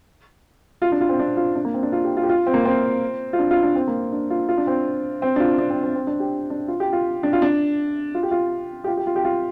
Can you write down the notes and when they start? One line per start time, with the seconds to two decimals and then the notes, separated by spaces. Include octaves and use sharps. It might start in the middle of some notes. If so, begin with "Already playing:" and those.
0.82 F4
0.92 D4
1.01 F4
1.09 C4
1.19 D4
1.37 F4
1.55 D4
1.65 A#3
1.74 C4
1.83 D4
1.92 F4
2.04 G4
2.17 F4
2.23 G4
2.29 F4
2.46 C4
2.54 A#3
2.65 C4
3.33 F4
3.39 D4
3.51 F4
3.63 D4
3.76 C4
3.87 A#3
4.12 D4
4.30 F4
4.49 F4
4.58 D4
4.67 C4
5.22 C4
5.36 D4
5.40 F4
5.58 D4
5.70 C4
5.83 C4
5.96 C4
6.07 D4
6.20 G4
6.50 D4
6.68 F4
6.80 G4
6.93 F4
7.23 D4
7.33 F4
7.42 D4
8.15 F4
8.23 G4
8.31 F4
8.84 G4
8.88 F4
8.97 G4
9.07 F4
9.16 G4
9.24 F4